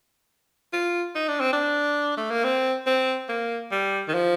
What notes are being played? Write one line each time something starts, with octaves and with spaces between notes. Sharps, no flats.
F4
D#4
D4
C4
D4
A3
A#3
C4
C4
A#3
G3
D#3
F3